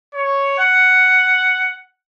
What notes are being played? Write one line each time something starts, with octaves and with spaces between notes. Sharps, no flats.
C#5
F#5